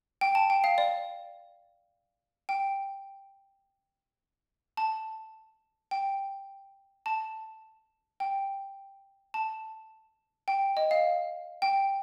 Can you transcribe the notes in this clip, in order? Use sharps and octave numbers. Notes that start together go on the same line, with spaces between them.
G5
A5
G5
F5
D5
G5
A5
G5
A5
G5
A5
G5
D#5
F5
G5